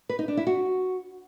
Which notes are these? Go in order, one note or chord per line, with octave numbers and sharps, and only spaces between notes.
B4
D#4
D4
E4
F#4